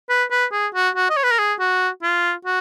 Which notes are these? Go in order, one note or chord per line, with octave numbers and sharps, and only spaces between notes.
B4
B4
G#4
F#4
F#4
D#5
C#5
B4
A#4
G#4
F#4
F4
F#4